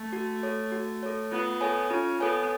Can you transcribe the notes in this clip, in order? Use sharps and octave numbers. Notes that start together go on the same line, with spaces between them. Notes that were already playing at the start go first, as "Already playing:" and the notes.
Already playing: A3
F#4
A4 C#5
F#4
A4 C#5
B3 F4
A4 C#5 G#5
C#4 F4
B3 A4 C#5 G#5